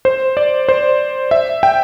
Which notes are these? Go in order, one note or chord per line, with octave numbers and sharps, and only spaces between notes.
C5
D5
C5
E5
G5